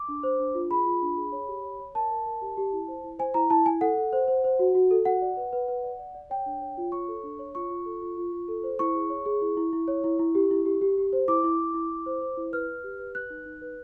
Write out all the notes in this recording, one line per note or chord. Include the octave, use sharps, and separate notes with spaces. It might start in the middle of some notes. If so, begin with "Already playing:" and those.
Already playing: D6
D4
C5
D4
F4
G#4 B5
F4
D4
G#4
C#5
G4
C#5
C#5
A#4 A5
A#4
A#4
G4
G4
E4
C5
E4
C5 G#5
E4 A#5
E4 A5
E4 G#5
A4 F#5
A4
C5
C5
C5
F#4
F#4
A4
F#4 F#5
D5
B4
B4
B4
D5
D5
D5
C#5 G5
D4
C#5
F4
C#5 C#6
A4
D4
C#5
F4 C#6
F4
A4
F4
F4
F4
A4
C5
E4 C#6
G#4
C#5
G#4
E4
E4
E4
C#5
E4
E4
G4
E4
G4
G4
G4
C5
E4 D6
E4
E4
E4
E4
C5
C5
E4
B4 F6
B4
G4
B4
B4 F#6
D#4
D#4
B4